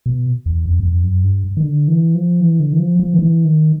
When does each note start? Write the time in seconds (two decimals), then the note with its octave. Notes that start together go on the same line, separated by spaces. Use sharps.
0.06 B2
0.46 E2
0.65 F2
0.80 F#2
0.84 F2
1.03 F#2
1.23 G2
1.57 D#3
1.63 D3
1.88 E3
2.15 F3
2.40 E3
2.60 D3
2.73 E3
2.79 F3
2.99 F3
3.14 D#3
3.19 E3
3.45 D#3